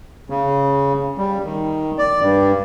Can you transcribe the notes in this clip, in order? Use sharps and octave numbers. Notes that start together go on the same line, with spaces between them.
C#3
G3
D#3
D5
G2